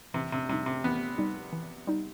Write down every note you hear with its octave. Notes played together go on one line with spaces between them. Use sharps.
C3 E3
C3
C3 G3 D#4
C3
E3 B3
G3 D#4
E3
G3 D#4